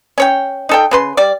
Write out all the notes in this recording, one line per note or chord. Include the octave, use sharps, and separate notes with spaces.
C#4 C#5 G5
D#4 A4 G5
C#3 B4 C6
G3 D5